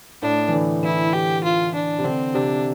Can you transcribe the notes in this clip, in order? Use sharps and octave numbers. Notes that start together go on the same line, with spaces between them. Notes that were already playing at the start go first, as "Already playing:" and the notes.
A2 D4
E3
D3
E3 E4
G4
F4
D4
C3
D3 C4
C3 D4